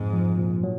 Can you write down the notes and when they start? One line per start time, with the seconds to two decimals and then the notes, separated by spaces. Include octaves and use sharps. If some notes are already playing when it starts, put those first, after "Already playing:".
Already playing: F2 G#2
0.13 F3
0.38 A#2
0.63 F#3